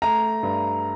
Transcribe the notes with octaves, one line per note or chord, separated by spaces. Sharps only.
A3 A#5
G2